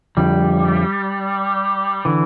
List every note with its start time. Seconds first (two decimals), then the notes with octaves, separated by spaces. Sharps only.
0.17 F2 D3 F3 G3
2.05 D3 E3